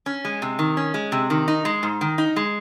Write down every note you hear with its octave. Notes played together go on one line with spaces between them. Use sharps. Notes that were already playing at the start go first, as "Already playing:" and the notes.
C#4
G#3
C3
D#3
C#4
G#3
C3
D#3
D#4
G#3
G#2
D#3
D#4
G#3